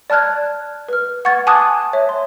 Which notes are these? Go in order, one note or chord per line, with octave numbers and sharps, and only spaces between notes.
D5 A5 F6 F#6 G#6
B4 F6
F#5 C#6 G#6 A6
G#5 A5 D6 D#6 F#6 G#6
C#5 E5
C6